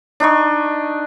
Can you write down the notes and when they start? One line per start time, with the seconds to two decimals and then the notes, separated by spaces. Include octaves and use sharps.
0.20 D4 D#4 D#5 C#6